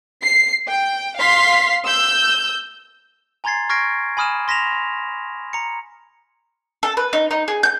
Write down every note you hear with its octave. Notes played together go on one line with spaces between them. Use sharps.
C7
G5
F5 C6 B6 C7
E6 G6
G#5 A#5 C6 G#6 A6 C7
C#6 F6 G#6 A#6 C7 D7
G#5 B5 D#6 F6 D#7 E7
C6 A#6 B6 E7 F7
A#5 C#7
A4
B4
D#4
D#4
G#4
G6